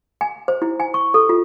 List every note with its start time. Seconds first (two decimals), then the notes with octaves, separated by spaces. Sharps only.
0.21 G#5
0.48 C5
0.62 E4
0.80 G#5
0.94 C#6
1.14 A4
1.29 F4